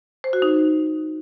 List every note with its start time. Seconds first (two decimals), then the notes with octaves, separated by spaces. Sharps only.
0.24 C5
0.33 F#4
0.42 D#4